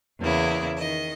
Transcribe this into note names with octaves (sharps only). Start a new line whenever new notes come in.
E2 C#3 A#3 E4
D#3 D#5